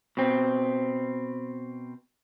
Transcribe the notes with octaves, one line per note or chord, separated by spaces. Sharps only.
B2 C4